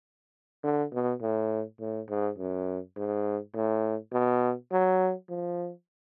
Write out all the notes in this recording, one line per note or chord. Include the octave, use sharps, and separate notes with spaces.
D3
B2
A2
A2
G#2
F#2
G#2
A2
B2
F#3
F3